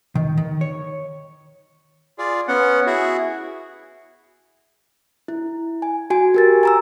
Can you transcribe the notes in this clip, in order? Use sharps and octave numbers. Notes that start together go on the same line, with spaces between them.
D#3
D#3
C#5
F4 G#4 D5
B3 C#4 F#5
E4 F#4 G#4
E4
G#5
F#4 G#5
G4 A#4 A6
G#5 A#5 E6